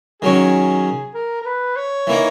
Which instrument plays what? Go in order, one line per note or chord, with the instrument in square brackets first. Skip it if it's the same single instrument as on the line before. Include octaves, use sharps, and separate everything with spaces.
[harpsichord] D#3 F#3 C#4 [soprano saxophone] G#4
[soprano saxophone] A#4
A#4
B4
C#5
[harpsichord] E3 A#3 D#4